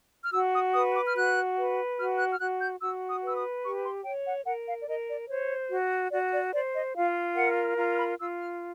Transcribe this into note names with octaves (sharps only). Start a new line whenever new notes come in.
F6
F#4 E6
D#6
B4 D#6
D6
F6
F#4 F#6
B4
F#4 F6
F#6
F6
F#4 F#6
G6
F#4 E6
D#6
B4 E6
D#6
G4 C#6
C6
C#5 G5
F#5
A#4 F#5
F5
D5
A#4 D#5
D5
C5 C#5
F#4
F#4 D5
D5
C5 D5
D#5
F4 F5
A#4 F#5
F4 A#5
B5
F4 E6
F6